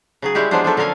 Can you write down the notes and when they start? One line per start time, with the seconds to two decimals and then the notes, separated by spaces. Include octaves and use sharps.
0.22 C#3 F#3 G#4
0.35 G3 G#3 E4 F#4 G4
0.51 F3 F#3 G#3 B3 D4 C5
0.64 F3 F#3 A4 E5
0.77 D3 C#4 A4 A#4 F5 G#5